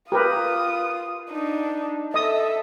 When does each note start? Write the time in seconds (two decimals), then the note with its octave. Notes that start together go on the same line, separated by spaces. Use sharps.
0.12 F4 G4 A#4 B4 D#6
1.30 D4 D#4
2.14 A4 D#5 E5 D#6